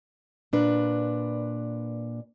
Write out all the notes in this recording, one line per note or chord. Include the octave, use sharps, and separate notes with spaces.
A#2 D4 B4